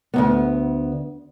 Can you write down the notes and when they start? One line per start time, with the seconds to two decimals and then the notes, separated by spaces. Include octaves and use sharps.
0.14 D2 G2 B3